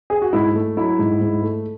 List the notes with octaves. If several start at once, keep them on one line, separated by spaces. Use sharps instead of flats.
G#4
F#4
G#2 E4
A3
F#3 E4
G#2
G#2
A3